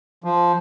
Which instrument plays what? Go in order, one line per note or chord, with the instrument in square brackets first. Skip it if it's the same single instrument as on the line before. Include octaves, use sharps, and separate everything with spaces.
[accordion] F3